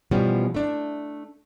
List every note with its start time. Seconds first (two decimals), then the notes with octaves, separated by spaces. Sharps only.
0.11 B2 E3 F3 G3 B3 C#4
0.55 A3 D4